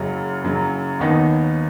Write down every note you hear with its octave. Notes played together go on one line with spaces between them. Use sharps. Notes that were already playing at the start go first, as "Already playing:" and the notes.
Already playing: F#1 F#2 C#3 F#3
F#1 F#2 C#3 F#3
D#2 D#3 B3 D#4 B4